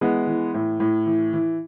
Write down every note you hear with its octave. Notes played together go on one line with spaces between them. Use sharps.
E3 G#3 B3
E3
A2
A2
E3
E3